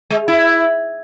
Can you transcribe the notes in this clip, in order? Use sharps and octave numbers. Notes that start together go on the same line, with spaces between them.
G#3
E4